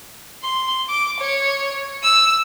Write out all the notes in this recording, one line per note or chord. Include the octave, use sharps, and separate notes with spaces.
C6
D6
C#5
E6